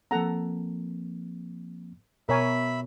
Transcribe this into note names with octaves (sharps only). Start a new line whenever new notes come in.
F3 A#3 C4 A4 F#5 A#5
B2 A#4 C#5 E5 G#5 B5